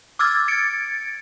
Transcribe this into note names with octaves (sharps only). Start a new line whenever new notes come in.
D6 E6 F6 G#6 A6
G#6 A6 C#7 D7